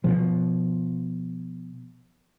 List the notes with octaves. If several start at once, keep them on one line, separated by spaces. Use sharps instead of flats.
B2 F3